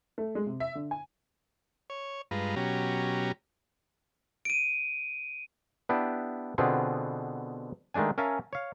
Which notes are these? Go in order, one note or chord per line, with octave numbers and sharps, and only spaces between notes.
A3
G#3
C3
E5
D3
G#5
C#5
G2 G#3 F4 B4 A#5
B2 F#3 C#4 G4 A#5
D7 D#7
B3 D4 E4 G4 B4
B2 D3 B3 C4 F4 G#4
D#3 G#3 A3 D4 G#5
C#4 A#4 E5 F5 G#5 A5
C#5 F5